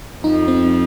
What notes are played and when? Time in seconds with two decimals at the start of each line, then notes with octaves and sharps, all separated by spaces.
0.23 F2 F3 D#4
0.48 C4